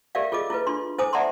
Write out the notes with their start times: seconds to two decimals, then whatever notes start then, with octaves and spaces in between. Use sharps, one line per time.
0.15 G4 A4 A#4 D5 E5 F5
0.32 F4 G#4 A4 D#5 D6
0.50 E4 F4 A4 B4
0.67 D4 F4 C6
0.98 E4 A4 C5 G#5 D6 D#6
1.13 D5 E5 F#5 A5 A#5 C6